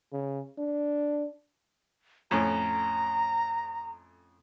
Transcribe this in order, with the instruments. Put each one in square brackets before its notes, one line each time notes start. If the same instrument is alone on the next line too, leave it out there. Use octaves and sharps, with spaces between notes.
[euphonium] C#3
D4
[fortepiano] F2 A2 C#4 [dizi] A#5